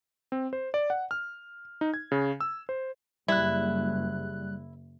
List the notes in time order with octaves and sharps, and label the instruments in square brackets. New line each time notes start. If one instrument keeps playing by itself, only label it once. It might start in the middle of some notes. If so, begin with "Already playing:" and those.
[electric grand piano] C4
C5
D5
F#5
F6
D#4
G#6
C#3
E6
C5
[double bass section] F#1 [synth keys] G3 F#6 [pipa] E4